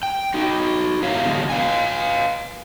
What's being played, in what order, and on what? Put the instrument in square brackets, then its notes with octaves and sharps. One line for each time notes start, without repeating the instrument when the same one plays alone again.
[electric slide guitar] G5
D#4 F#4
B3 A#4 C#5 E5 F5
D3 F#3 G#3 A#3 B3
B4 F5 G#5